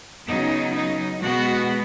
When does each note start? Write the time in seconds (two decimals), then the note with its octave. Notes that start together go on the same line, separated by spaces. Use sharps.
0.27 C#3 F#3 B3 D#4
0.74 D#4
1.21 B2 G#3 B3 F#4